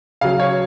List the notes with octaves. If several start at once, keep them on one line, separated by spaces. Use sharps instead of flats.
C#3 F#3 F5
C#5